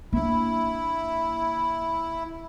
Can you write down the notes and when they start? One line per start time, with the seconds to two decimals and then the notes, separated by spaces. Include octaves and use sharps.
0.13 A#3 D4 E4